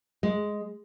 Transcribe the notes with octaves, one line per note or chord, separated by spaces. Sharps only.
G#3